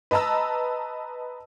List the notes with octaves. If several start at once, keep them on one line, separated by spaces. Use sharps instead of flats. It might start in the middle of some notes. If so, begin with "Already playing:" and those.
B4 D#5 A5 A#5 E6